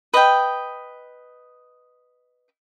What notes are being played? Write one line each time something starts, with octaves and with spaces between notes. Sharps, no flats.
B4 D#5 G5